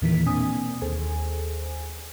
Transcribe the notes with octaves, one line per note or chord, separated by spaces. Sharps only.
E2 A#2 D#3 E3 A#3 B6
B2 A#3 C4 D4 G#5 D#6
D#2 G#4 A4 C5 G#5